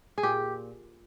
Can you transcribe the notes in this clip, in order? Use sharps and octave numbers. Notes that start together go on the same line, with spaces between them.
G#4
A#2 G4